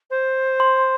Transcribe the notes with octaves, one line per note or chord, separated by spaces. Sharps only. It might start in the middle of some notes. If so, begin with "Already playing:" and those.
C5
C6